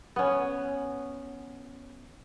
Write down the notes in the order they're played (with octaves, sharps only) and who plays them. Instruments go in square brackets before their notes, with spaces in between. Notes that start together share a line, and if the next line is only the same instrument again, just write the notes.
[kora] B3 C#4